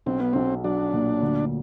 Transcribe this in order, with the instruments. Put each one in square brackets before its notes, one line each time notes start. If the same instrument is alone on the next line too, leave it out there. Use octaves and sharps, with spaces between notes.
[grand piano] B1 [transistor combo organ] C4
[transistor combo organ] B3
[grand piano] B1 [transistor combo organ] C4
[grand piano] F#3 [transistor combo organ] D4
[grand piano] A#2
D2